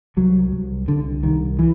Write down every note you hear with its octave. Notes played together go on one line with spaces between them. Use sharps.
C2 F#3
C2
C2 D3
C2 D#3
E3